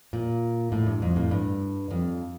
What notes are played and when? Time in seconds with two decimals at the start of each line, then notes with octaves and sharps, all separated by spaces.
0.13 A#2
0.72 A2
0.87 G2
1.02 F2
1.16 A2
1.31 G2
1.91 F2